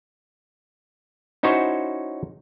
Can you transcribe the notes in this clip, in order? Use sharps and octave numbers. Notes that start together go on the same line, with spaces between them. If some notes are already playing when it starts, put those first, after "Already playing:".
C#4 D#4 E4 F#4 C5 C#5